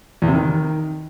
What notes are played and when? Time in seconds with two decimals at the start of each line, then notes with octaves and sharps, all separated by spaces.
0.22 E2
0.28 C3
0.34 D#3